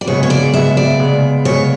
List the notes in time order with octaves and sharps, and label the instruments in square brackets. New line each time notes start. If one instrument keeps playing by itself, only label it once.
[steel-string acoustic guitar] D5
[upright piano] C#3 G#3 B3 [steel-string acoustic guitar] C#5
[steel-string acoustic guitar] C#5
D5
[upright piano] C#3 G#3 B3 [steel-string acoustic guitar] E5
[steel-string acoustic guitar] D5
[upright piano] C#3 G#3 B3
[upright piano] C#3 G#3 B3 [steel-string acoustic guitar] C#5